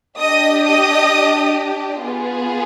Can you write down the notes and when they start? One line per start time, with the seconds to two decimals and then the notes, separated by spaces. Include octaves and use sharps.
0.20 D4 G4 D#5 D#6
0.65 D#5 D#6
2.02 B3 F4 G#4